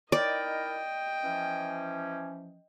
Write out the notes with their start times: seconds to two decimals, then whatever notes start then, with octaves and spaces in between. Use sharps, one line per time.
0.12 D#4 E4 A#4 D5 D#5 G5
1.23 E3 F3 C#4